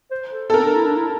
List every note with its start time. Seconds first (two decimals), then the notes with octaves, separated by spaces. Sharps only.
0.11 C5
0.32 A4
0.50 A4
0.54 C4 A#4
0.65 D4
0.76 E4
0.86 D4
0.96 E4